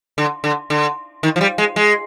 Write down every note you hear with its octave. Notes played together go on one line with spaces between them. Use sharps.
D3
D3
D3
D#3
F3
G3
G#3
G#3